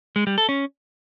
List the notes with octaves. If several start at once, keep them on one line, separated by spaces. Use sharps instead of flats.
G#3
G3
A4
C#4